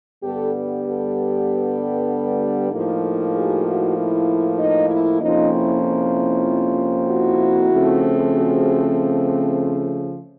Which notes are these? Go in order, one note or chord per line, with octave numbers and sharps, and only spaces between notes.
G2 D3 G3 B3 G4 A4
G4 A4
A2 F3 A#3 D#4
F#4 G#4
E4 F#4
E4
D#4
E4
F2 C3 F3 A#3 C#4 D#4
E4
E4
E4 F#4
C#3 F3 A3 C4
F#4 G#4